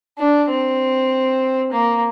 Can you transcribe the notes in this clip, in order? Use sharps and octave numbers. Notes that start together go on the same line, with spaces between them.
D4
C4
A#3